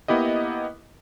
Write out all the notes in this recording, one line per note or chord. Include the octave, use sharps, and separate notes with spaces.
A#3 B3 E4 G4 D#5